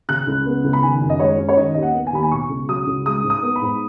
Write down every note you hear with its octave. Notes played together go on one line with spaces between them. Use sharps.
C#3 F#6
C#2
B3
C#2
B5
D#3 G#5
F#2
D#5
G#3 C#5
C#4
C#5
D#3 D#5
D#2 D#5
F#5
B3
G#5
D#2 B5
G#5
B2 C#6
C#2
F#3 D#6
C#2
G#3 D#6
G#2
D#6
B3
B5
G#2